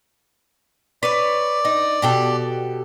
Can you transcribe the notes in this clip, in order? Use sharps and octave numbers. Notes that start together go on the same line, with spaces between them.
B4 C#5 D5
D#4
B2 G4 A4